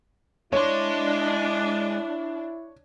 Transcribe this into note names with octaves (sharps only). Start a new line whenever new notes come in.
G#3 D4 E4 C#5 C6